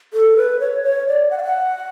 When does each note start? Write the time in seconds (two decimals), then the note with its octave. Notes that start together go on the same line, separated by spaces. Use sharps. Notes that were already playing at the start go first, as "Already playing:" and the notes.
0.14 A4
0.37 B4
0.60 C#5
0.83 C#5
1.07 D5
1.31 F#5
1.38 F5
1.44 F#5